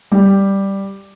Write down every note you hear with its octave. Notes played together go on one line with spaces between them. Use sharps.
G3